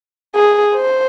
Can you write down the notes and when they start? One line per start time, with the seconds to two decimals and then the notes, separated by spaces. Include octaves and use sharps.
0.35 G#4
0.75 C5